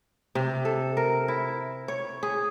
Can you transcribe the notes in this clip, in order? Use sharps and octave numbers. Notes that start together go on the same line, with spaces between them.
C3
A4
A#4
E4
C#5
G#4